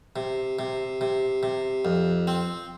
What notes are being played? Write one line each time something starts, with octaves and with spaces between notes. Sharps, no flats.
C3
C3
C3
C3
F2
C4